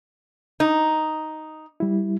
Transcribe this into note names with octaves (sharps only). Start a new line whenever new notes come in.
D#4
G3 E4